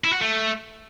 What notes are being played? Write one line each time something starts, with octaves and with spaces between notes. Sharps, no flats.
E4
F#4
A3